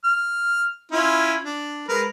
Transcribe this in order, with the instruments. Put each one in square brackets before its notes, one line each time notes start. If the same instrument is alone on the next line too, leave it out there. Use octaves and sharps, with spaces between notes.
[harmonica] F6
C#4 E4 F4
D4
G#3 A#4 B4